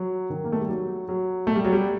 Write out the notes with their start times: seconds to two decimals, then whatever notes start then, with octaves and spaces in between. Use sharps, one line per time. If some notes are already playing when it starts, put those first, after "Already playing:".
Already playing: F#3
0.30 D#3
0.44 A#3
0.52 A3
0.61 G3
0.69 F#3
1.09 F#3
1.47 A3
1.55 G3
1.64 F#3
1.73 G3